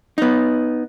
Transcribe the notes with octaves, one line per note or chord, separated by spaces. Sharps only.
B3 D#4